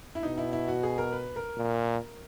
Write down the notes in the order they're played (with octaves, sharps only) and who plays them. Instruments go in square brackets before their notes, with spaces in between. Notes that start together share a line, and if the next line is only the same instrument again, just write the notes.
[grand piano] E4
[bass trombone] B2 [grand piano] D#4
[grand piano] E4
E4
F#4
G#4
A#4
B4
A#4
[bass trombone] A#2